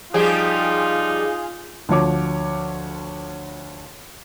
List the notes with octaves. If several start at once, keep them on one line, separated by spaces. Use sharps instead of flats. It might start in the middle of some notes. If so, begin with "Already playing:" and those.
F3 G3 D#4 F4 G4 G#4
D2 F3 C#5 D6